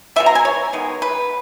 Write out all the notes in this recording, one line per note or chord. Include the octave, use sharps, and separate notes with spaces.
B2 G#3 B3 E5
A#5
G#5
C#5
D#3 G#3 B3
B4